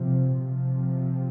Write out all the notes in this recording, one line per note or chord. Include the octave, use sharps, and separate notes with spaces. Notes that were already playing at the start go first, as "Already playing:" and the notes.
Already playing: C3 F3
C3 F3